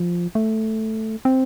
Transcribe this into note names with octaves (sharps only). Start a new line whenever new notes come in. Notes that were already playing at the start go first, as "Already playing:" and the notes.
Already playing: F3
A3
C4